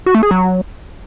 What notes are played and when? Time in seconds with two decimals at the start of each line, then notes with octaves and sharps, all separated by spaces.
0.06 F#4
0.15 A3
0.23 G#4
0.31 F#3